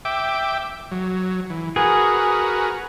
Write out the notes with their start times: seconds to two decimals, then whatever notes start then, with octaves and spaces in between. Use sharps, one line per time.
0.05 E5 G5 D6
0.91 F#3
1.50 E3
1.76 F#4 G#4 A#4 B4